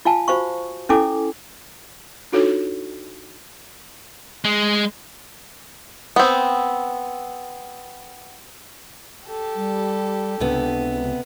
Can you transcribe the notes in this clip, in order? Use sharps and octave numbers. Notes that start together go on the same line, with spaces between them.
F4 F5 G#5 A5
F#4 C5 F5 C#6
C#4 E4 A4 G#5 D6
D4 D#4 F4 F#4 A4 C#5
G#3
B3 C4
G4 A4
G3
C#2 C3 B3 D4